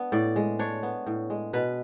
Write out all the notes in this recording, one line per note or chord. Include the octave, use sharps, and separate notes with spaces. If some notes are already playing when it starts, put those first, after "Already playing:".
Already playing: B3 D4
A2 D5
G#3
D4 C#5
B3
A2
G#3
B2 B4